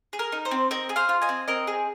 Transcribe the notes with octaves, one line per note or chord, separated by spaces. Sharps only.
G#4
A#4
D#4
C5
C4
C4 A#4 D#5
G#4
C5 F5
F4
D#5 G#5
C4
C4 A#4 D#5
G#4